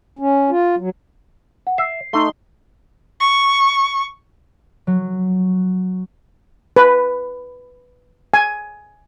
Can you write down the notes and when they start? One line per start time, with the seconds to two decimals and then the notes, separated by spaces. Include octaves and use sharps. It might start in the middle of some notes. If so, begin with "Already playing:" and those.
0.19 C#4
0.50 F4
0.78 F#3
1.67 F#5
1.78 E5 C7
2.13 A3 D#4 C6
3.20 C#6
4.87 F#3
6.76 B4
8.34 G#5